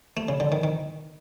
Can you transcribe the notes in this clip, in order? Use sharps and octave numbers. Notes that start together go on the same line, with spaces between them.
A3
C#3
D3
D#3
D#3